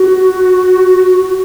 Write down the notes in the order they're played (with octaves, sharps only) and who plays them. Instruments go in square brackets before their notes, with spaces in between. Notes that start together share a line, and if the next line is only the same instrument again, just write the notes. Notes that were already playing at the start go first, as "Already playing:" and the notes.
Already playing: [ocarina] F#4